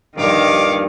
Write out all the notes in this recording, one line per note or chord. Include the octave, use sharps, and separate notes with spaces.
D#1 A#1 G2 A#2 D#3 C#5 F5 D6